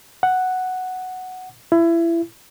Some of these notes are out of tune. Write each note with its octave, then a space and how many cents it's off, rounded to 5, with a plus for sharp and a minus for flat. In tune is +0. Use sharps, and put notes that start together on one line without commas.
F#5 +0
E4 +25